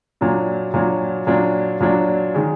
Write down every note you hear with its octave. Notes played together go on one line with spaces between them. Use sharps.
A#2 F#3 D4
A#2 F#3 D4
A#2 F#3 D4
A#2 F#3 D4
D#3 G#3